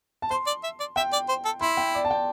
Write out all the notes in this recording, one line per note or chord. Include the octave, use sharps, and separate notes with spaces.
A5
C5 C6
D5
E5
D5
E5 G5
D5
C5
A4
E4 C6
G5
D5
A5
G5